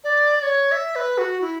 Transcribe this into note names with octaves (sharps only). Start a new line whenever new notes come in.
D5
D5
C#5
E5
B4
F#4
E4